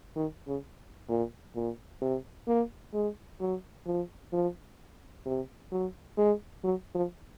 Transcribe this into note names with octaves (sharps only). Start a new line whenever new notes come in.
D#3
C#3
A#2
A#2
C3
A#3
G#3
F#3
F3
F3
C3
F#3
G#3
F#3
F3